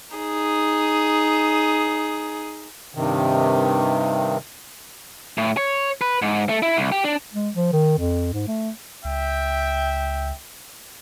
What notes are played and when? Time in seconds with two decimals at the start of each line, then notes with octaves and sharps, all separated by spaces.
0.16 D#4 G#4
2.95 G2 C3 D#3
5.38 A2
5.57 C#5
6.01 B4
6.22 G#2
6.49 A3
6.62 E4
6.77 C2
6.92 G4
7.04 D4
7.34 G#3
7.55 F3
7.73 D#3
7.98 F2
8.33 G#2
8.47 A3
9.05 C#2 E5 G5